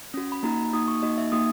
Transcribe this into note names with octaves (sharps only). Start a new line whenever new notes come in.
C#4 F#4
B5
A#3 D#4 F#4 A#5
A#3 D#4 F#4 D#6
C#6
A#3 D#4 F#4 D#5
E5
A#3 D#4 F#4 D#6